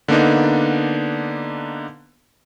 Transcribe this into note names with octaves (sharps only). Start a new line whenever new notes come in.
D3 A#3 B3 D4 D#4